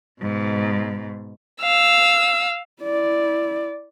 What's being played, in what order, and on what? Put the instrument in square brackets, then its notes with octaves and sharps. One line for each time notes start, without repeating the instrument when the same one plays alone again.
[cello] G#2 B2
[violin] F5 E6
[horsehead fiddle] E4 D5